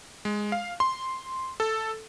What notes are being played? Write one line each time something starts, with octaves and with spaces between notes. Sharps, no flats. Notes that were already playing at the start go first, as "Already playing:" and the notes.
G#3
F5
C6
A4